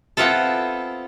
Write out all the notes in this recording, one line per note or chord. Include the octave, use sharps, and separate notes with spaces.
B3 C4 E4 F4 A4